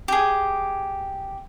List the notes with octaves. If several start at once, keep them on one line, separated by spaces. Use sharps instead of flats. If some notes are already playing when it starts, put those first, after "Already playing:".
G4 G#4